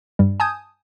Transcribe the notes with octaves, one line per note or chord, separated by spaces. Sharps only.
G2 G3
G#5 A5 D#6 G6 G#6